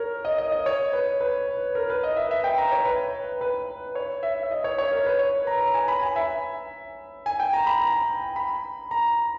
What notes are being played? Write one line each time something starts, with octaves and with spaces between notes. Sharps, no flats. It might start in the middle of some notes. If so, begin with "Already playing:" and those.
Already playing: A#4 C#5
D#5
D#5
D#5
C#5
B4
B4
A#4
B4
D#5
E5
E5
G5
A#5
C#5
B4
B4
C#5
E5
E5
D#5
C#5
C#5
A#4
B4
C#5
A#5
A#5
G#5
B5
G#5
E5
G#5
G5
A#5
B5
A#5
B5
A#5